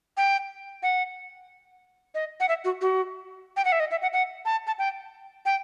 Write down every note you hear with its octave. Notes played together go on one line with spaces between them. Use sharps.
G5
F#5
D#5
F#5
E5
F#4
F#4
G5
F#5
E5
D#5
E5
F#5
F#5
A5
A5
G5
G5